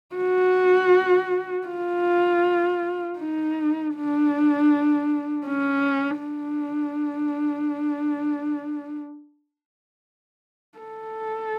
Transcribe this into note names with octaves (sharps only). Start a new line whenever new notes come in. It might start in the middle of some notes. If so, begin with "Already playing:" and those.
F#4
F4
D#4
D4
C#4
D4
A4